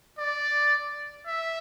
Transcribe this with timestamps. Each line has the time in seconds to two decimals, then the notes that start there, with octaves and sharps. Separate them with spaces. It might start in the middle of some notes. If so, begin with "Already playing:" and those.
0.18 D5
1.27 E5